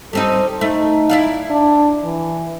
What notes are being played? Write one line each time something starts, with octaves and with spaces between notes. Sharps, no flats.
G3 C4 D#4 A4
A3 D#4
E4 D5 F5
D4
E3